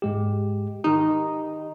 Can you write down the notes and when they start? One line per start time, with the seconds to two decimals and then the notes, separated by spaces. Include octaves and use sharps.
0.02 G#2 G#3 G4
0.84 D#3 D#4 G4